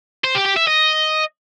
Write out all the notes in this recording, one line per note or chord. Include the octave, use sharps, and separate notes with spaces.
C5
G4
G4
E5
D#5